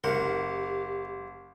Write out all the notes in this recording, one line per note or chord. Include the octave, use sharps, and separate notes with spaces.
F#1 G4 A#4 F#5